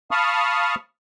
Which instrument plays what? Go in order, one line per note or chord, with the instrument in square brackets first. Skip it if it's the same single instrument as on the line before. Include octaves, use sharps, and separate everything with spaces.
[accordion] F5 A5 B5 C#6 D#6 F6